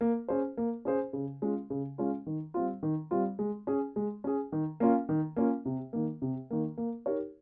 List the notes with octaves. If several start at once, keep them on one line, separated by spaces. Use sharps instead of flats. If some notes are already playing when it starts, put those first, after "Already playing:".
A#3
C#4 G#4 C5
A#3
C#4 G#4 C5
C#3
G#3 C#4 F4
C#3
G#3 C#4 F4
D#3
G3 C4 F4
D#3
G3 C4 F4
G#3
C#4 G#4
G#3
C#4 G#4
D#3
A#3 C#4 F4
D#3
A#3 C#4 F4
C3
D#3 A#3
C3
D#3 A#3
A#3
D#4 G4 A#4 C#5